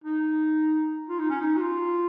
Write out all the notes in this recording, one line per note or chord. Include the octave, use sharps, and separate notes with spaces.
D#4
F4
D#4
C#4
D#4
F#4
F4